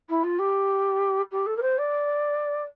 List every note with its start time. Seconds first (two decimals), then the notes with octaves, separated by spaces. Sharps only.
0.09 E4
0.23 F4
0.38 G4
1.31 G4
1.46 A4
1.56 A#4
1.62 C5
1.78 D5